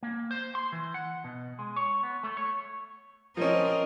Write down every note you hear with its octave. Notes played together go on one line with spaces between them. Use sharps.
A#3
C5
C6
E3
F#5
B2
G#3
C#5
B3
A3
C#5
F3 C4 C#4 A#4 D#5